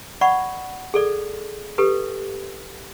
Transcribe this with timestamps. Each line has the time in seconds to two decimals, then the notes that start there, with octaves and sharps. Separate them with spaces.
0.21 D5 F#5 B5 C#6
0.94 G#4 A4 D5
1.78 G4 A4 B4